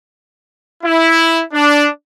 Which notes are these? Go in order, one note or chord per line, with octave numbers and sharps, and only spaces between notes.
E4
D4